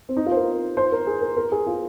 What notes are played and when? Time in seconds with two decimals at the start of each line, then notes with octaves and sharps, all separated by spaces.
0.09 C4
0.17 D#4
0.26 F4
0.31 C5
0.36 A#4
0.77 C5
0.92 A#4
1.07 G#4
1.21 A#4
1.36 A#4
1.52 G#4
1.67 F4